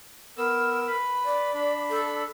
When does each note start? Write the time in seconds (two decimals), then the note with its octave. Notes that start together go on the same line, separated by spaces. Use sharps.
0.38 B3 A#4 E6
0.87 B4 B5
1.25 D5
1.54 D4 B5
1.90 A4